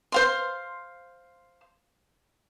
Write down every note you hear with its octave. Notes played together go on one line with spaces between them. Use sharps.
C5 F5 C6